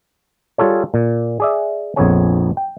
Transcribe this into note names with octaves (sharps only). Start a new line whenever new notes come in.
G3 F4 G#4 A4 C#5
A#2
G#4 D5 E5
A#1 F2 B3 G#4 C#5 G#5
G5